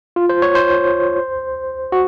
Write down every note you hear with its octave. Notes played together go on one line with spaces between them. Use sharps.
F4
C5
C#5
C5
F#4